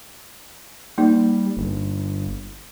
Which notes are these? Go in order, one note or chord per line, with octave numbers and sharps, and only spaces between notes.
G3 A#3 D#4
G1